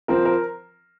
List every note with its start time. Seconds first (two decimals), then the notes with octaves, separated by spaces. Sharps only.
0.08 F3 C4 A#4
0.25 A#4